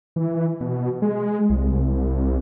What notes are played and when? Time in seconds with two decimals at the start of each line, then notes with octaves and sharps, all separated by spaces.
0.16 E3
0.61 B2
1.02 G#3
1.50 C2